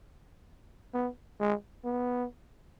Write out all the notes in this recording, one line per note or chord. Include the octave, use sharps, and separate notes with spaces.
B3
G#3
B3